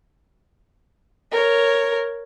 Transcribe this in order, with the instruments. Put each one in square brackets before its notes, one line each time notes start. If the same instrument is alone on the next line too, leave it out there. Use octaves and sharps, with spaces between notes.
[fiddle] A#4 C#5